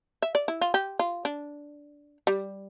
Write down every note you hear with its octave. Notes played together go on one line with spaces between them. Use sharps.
E5
D5
E4
F4
G4
F4
D4
G3